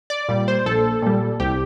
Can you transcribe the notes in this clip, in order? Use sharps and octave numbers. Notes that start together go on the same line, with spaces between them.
D5
A#2 G3
C5
A#1 A4
A#2 G3
C2 G4